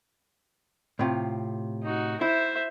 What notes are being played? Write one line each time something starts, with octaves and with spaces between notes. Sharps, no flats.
A2 C3 F4
D#4 F#4
E4 C5 E5